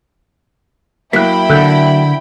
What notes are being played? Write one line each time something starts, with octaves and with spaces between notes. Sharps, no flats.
F#3 A#3 E4 G5 B5 F#6 B6
D3 A4 F#6 G6